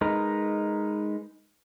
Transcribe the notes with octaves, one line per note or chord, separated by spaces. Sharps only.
G#3 D#4 A#4 B4